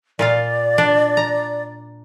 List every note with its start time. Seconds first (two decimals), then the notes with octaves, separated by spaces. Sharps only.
0.19 A#2 F4 D5 F5
0.78 D4
1.17 A#5